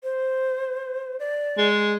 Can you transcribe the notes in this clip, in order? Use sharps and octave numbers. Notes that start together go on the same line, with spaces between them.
C5
D5
G#3